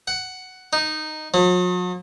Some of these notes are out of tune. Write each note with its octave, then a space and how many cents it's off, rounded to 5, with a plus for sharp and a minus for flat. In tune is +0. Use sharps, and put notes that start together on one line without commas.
F#5 +10
D#4 -10
F#3 -45